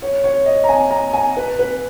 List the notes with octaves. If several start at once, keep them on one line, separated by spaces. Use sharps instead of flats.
C#5
C#5
D#5
A#5
G#5
A#5
G#5
B4
B4